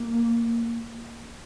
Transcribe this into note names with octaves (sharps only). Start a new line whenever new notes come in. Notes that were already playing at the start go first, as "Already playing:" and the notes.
Already playing: A#3